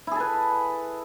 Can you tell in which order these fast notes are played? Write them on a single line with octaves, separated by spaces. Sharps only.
E4 G#4 A4 B4